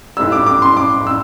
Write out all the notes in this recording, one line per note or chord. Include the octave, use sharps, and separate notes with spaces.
B1 A2 G3 E6
D6
D6
C6
D6
E6